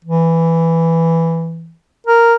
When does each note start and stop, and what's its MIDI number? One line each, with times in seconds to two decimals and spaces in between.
0.05 1.73 52
2.07 2.35 70